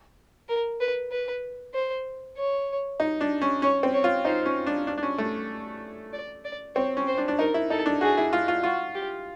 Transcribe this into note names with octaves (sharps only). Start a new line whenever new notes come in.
A#4
B4
B4
C5
C#5
D#4
D4
C#4
C#4 C#5
C4
C#5
F4
D#4 C5
C#4
D4
D4
D4
C#4
A3
D5
D5
C4 C#5
C#4
C5
D4
D4
D#4 A#4
E4
D#4 A4
D4
F#4 G#4
E4
F4
F4
F4 F#4
G4